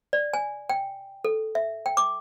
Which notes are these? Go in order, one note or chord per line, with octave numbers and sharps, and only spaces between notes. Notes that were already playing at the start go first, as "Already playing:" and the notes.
D5
G#5
G5
A4
E5
G5
D6